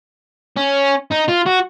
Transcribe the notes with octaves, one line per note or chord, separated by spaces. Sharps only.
C#4
D#4
F4
F#4